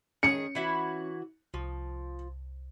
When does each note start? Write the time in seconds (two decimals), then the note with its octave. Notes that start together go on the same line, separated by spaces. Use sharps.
0.23 D#3 C#4 G#4 C#5 C#7
0.55 E3 E4 F#4
1.54 C2 F3